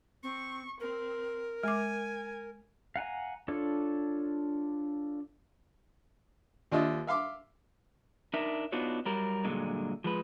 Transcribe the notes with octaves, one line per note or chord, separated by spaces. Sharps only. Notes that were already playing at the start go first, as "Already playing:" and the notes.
C4 C#6
C4 A#4
G#3 G#5 D6
F5 F#5 G#5 A#5
D4 F4 A4 C#5
D#2 D4 F4 D#5 E5
E5 F5 C6 D6
D4 D#4 A#4 E5
B3 D4 D#4 F4 F#4 C#5
F#3 G3 A#4
G2 A#2 D3 F#3 G#3
F3 G#3 B4